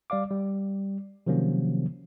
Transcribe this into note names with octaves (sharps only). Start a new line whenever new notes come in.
G3 D5 F5 D6
G3
C3 D#3 F3 F#3 A#3 C#4